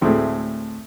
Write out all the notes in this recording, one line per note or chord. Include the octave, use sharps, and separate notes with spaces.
D2 A2 G#3 A3 C4